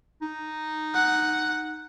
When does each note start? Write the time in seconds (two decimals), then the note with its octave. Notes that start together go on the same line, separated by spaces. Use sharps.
0.22 D#4
0.94 F#5